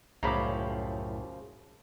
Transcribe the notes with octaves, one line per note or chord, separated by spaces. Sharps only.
C2 F#2 A2 C#3 F3 A#5 B5 D6